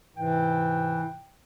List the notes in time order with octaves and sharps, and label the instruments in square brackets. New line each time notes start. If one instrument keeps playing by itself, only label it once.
[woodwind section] G#2 C3 G5 [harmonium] E3